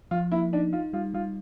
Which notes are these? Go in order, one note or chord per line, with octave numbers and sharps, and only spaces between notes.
F3 F4
A#3 E4
D4 D#4
D#4 F4
G3 F4
G3 F4